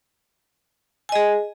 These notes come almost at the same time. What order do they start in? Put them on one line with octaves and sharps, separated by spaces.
G#5 D#5 G#4